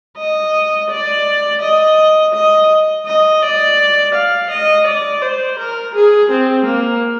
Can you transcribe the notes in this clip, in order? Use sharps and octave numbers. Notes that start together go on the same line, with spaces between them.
D#5
D5
D#5
D#5
D#5
D5
F5
D#5
D5
C5
A#4
G#4
C4
A#3